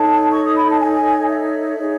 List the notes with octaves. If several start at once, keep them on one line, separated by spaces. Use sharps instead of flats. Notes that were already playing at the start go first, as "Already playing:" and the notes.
Already playing: D#4 A4 C#5 A5
C#6
D#6
B5
A5
G#5
E5
D#4 G#4 C#5